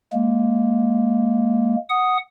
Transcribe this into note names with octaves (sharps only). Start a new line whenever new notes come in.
G#3 A#3
F#5 D#6